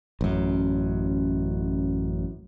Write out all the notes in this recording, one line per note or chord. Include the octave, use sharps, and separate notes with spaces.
A1 F#2